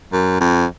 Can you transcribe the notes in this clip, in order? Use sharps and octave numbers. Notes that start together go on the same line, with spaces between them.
F#2
F2